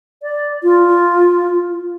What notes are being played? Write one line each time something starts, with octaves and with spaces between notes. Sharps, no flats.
D5
F4